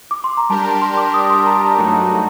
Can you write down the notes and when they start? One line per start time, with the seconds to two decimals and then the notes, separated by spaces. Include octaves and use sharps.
0.11 D6
0.24 C6
0.37 A#5
0.49 G3 D4 G4 A#4 A5
0.65 A5
0.82 C6
0.97 D6
1.14 D#6
1.30 C6
1.39 A5
1.46 A#5
1.61 A5
1.77 G2 F#3 A3 D#4 F#4